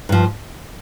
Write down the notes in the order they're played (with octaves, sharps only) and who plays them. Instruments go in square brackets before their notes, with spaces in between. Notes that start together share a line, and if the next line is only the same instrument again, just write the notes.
[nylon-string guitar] G2 F3